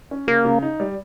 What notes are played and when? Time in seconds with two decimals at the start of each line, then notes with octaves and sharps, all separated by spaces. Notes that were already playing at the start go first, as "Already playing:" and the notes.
0.11 C#4
0.27 C#3 A#3
0.45 C#3
0.62 D#4
0.80 G3